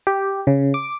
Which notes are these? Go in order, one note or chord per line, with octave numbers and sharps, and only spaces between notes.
G4
C#3
D6